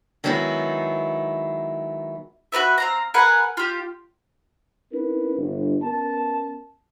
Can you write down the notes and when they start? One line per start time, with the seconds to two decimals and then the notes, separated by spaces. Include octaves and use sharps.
0.24 D#3 F#3 G#3 B3 D#4 E4
2.52 F#4 A#4 B4 E5
2.78 C4 F5 A#5
3.14 G#4 A#4 B4 F#5
3.57 F4 G4
4.93 C4 C#4 D#4 E4 A#4 B4
5.36 G1
5.83 B3 C#4 A#4 A5